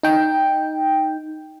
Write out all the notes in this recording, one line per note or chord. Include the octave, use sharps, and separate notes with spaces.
D#4 G5